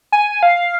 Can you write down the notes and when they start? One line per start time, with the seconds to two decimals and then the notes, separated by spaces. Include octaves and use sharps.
0.12 G#5
0.43 F5